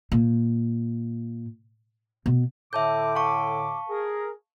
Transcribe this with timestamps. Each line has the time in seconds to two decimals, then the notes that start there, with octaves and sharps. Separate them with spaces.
0.12 A#2
2.26 B2
2.73 A2 D3 E5 A5 D6 G6
3.15 F5 A5 C#6
3.90 G#4 A#4